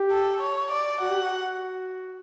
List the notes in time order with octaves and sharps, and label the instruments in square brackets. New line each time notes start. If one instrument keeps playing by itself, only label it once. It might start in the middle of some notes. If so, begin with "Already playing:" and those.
Already playing: [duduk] G4
[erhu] A4
C#5
D5
[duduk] F#4 [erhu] F#5
[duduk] G4
F#4